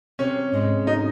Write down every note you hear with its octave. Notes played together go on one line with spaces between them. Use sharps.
C3 C4 C#4
G#2 G#3
D#4